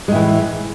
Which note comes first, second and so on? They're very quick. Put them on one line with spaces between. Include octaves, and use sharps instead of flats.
G#3 A2 E3